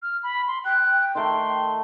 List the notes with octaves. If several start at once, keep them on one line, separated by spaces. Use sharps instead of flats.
F6
B5
C6
G5 F#6
D#3 A3 A#4 C6